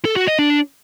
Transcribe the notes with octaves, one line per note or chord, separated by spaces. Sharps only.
A4
F#4
D#5
D4